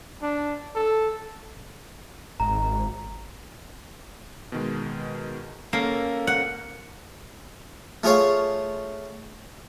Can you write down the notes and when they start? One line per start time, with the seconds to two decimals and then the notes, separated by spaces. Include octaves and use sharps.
0.22 D4
0.76 A4
2.40 G#1 A#5
4.52 B2 D#3 G#3
5.73 A#3 C#4 A4 A#4
6.27 F#5
8.04 A3 F4 G#4 C#5 F5